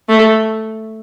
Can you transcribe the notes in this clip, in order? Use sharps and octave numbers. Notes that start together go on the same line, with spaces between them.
A3